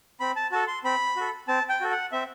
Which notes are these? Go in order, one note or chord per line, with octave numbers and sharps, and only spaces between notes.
C4 B5
A5
F#4 A4 A5
C6
C4 B5
F#4 A4
C4 A5
G5
F#4 A4
F#5
C4 E5